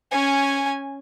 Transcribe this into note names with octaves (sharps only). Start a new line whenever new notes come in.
C#4 G#5